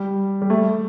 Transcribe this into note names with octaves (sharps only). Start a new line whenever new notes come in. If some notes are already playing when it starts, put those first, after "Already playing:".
Already playing: G3
G3
A3